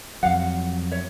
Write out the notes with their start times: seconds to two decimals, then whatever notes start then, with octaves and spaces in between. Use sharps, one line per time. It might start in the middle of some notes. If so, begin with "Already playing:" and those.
0.23 F2 F#3 F5 F#5
0.91 C#5 E5